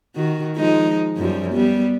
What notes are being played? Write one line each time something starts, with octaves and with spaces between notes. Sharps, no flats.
D#3 F#4
F3 G#3 D#4
F#2 F3 G3
G3 B3